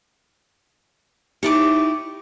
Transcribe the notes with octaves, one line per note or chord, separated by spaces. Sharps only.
D#4 E4 G4 C#5 D5 D6